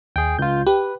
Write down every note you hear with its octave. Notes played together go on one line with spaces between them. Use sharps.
D#2 G#4 G5
C#2 F4 G6
G4 B4